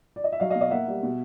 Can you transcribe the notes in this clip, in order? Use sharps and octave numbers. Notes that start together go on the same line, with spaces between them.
D5
D#5
E5
F#3 D#5 F5
D#5 F5
B2
D#5 F5
A#3 E5 F#5
G3
B2